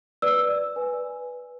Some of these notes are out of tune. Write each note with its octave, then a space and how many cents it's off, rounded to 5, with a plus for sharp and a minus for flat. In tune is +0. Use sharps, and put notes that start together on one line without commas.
B4 +0 D5 +0 E6 +0
B4 +0 G#5 +0